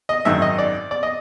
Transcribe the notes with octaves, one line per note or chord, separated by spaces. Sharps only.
D#5
G#1 F#2 D#3 E5
D#5
D5
D5
D#5